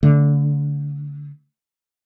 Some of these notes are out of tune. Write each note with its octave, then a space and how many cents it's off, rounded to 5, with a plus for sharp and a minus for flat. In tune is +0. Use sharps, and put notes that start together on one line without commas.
D3 -25 A3 +10